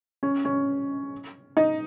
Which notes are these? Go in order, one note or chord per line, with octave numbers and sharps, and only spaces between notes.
C#4
C#4
D#4